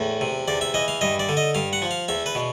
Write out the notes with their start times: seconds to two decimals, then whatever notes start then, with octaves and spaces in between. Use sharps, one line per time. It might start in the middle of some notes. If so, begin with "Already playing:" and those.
Already playing: E2 A2
0.21 C3
0.48 E2 D5
0.61 E5
0.74 E3 D#5
0.88 F5
1.01 G2 D#5
1.20 D5
1.29 D3
1.37 D#5
1.55 G2 F5
1.73 F#5
1.82 F3
1.91 F5
2.08 E2 E5
2.26 B4
2.35 B2